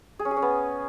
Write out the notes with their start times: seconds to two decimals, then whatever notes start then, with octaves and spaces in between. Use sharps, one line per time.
0.19 G#4
0.25 C#4
0.31 G#4
0.37 C#4
0.42 B3